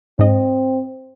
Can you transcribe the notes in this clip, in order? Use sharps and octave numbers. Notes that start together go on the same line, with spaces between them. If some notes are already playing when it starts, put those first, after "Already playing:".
G#2 C4 D#5